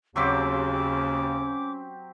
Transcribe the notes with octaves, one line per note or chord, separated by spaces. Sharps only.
D#2 C#3 F#3 C4 C#4 G4 D6